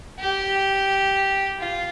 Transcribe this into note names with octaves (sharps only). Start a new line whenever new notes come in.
G4
F4